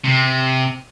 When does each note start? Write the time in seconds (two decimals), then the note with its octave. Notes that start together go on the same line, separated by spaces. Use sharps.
0.04 C3